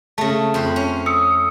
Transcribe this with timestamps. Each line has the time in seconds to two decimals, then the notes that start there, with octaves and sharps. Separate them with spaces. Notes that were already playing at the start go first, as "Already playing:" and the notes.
0.18 C#3 A3 A5
0.54 F2 C5 B5
0.76 C#4
1.06 D#6 E6 C#7